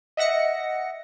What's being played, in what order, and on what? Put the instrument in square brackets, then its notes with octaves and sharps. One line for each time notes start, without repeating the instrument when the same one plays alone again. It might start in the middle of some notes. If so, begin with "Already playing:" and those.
[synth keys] D#5 E5 F#5 A#6 C#7